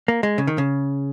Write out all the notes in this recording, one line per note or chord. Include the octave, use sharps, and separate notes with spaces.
A#3
G#3
C#3
D#3
C#3